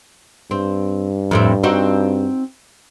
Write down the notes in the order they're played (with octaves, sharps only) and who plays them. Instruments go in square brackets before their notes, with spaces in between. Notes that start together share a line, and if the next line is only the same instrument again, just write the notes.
[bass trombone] G2 [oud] C4
[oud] F2 A2 C4
C4 D#4 F#4